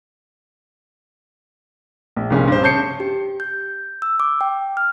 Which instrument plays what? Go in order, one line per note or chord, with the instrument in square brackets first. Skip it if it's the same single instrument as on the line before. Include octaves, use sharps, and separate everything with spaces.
[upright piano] A#1
C2 G2 A#2 F3 C#4 G#4
G2 C5
C#3 C#5 A5 G6 C7 C#7
[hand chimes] G4
G6
E6
D6
G5
F6